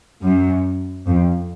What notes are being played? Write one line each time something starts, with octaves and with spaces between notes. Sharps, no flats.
F#2
F2